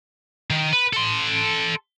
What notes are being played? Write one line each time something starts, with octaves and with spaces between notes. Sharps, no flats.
D#3
B4
A4 C6